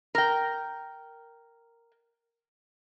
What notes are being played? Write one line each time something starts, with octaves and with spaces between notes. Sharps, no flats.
A#4 G5